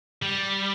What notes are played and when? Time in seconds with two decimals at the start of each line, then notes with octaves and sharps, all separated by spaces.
0.23 G3